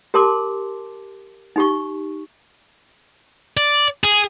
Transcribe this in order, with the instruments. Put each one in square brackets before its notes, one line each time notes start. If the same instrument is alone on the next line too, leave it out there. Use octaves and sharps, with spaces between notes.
[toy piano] G4 A#4 A5 C6 D6
D#4 G4 C#6
[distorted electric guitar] D5
G#4